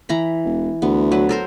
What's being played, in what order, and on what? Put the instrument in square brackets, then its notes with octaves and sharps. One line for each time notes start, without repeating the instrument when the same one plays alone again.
[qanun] E3 A#5 B5
[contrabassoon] E1
[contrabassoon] D2 [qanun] B3
[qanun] F#3 B4
A4 A#4 C5